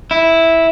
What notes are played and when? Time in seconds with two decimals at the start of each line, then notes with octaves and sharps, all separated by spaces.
0.11 E4